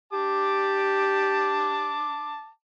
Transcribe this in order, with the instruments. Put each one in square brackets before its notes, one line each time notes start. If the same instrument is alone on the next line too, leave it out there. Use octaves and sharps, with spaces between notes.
[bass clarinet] G4 [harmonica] A5 D6